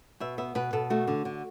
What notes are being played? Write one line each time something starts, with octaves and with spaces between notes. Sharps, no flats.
B2 E5
B3 E5
B2 B4
B2 A4
A3 F#4
D3
D3